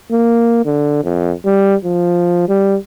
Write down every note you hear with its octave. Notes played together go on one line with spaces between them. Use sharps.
A#3
D3
F2
G3
F3
G3